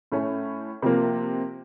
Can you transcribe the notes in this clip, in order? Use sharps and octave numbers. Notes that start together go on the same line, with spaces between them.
A2 A3 C#4
C3 F3 A#3